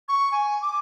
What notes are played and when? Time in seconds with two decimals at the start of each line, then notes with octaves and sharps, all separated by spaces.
0.09 C#6
0.32 G#5
0.62 D6